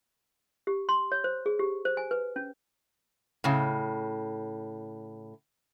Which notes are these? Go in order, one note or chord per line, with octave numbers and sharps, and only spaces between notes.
G4
C6
C#5
C5
G#4
G4
C5
G#5
B4
C#4
A2 C#3